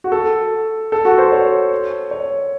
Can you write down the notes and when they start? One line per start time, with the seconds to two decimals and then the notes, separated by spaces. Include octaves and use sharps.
0.04 F#4
0.12 A4
0.92 A4
1.05 F#4
1.18 C5
1.32 C#5
2.11 C#5